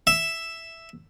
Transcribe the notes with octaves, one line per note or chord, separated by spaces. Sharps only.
E5